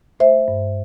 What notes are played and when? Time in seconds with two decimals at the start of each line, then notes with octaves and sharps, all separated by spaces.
0.19 A3 C5 E5
0.48 G2